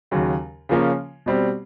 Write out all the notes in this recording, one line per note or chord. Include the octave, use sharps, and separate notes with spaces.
D#2 C#3 F#3
C#3 F3 A#3 C#4
B2 G3 C4